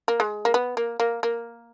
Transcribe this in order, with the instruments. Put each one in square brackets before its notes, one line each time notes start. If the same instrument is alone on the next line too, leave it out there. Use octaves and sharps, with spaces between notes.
[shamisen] A#3
G#3
A#3
B3
A#3
A#3
A#3